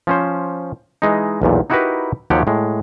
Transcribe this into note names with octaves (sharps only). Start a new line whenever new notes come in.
F3 C#4 C5
E3 G#3 D#4
B1 E2 A#2
D#4 E4 F#4 G4 A#4 B4
D#2 F3 F#3 G4 C#5 F#5
A2 G#3